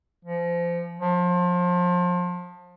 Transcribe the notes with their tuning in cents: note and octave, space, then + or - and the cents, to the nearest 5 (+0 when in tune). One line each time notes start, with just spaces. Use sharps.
F3 -25
F3 +30